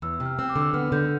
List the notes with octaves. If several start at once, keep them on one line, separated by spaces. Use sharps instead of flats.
E2 E6
E6
C3
F6
C4 E6
D6
D3
E6
B3 F6
D3 G6